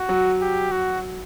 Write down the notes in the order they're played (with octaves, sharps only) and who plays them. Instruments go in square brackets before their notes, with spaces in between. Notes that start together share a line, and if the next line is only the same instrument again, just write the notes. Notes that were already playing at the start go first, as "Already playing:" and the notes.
Already playing: [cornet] F#4
[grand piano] F#3
[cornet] G4
F#4